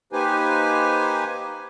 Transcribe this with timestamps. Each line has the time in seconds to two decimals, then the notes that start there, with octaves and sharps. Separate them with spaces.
0.13 A#3 D#4 G4 B4 C5 G#5